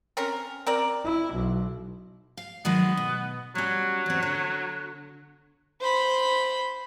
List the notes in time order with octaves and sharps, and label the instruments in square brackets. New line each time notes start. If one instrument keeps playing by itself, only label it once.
[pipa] C4 C#4 A#4
C4 A#4 D5
[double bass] E4
B1
[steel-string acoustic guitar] F5
[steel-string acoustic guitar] D#3 F#3 G#3 [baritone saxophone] B3
[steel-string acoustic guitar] B2
[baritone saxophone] F#3 [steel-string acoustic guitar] G3 C#4
[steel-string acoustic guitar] E2 C4
D3
[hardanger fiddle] C5 B5